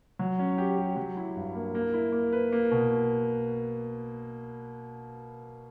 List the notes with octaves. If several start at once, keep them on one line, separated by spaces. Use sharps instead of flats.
F#3
C#4
G4
G4
F#3
E4
G2
A#3
A#3
E4
A#3
B4
A#3
B2